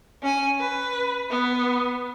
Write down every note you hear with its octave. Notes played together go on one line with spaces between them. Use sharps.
C#4 G#5
B4
B3